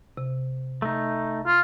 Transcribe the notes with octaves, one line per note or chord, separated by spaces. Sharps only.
C3
A3 D#4
F4